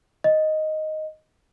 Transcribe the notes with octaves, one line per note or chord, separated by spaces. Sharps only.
D#5